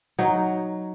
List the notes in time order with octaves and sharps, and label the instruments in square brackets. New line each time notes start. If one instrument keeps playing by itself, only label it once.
[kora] F#3 D#4